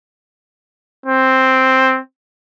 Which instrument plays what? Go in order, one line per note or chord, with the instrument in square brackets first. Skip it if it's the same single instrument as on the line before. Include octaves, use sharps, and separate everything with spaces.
[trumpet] C4